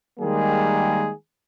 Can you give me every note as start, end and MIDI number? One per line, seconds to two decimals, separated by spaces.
0.20 1.10 51
0.20 1.10 55
0.20 1.10 56
0.20 1.10 58
0.20 1.10 68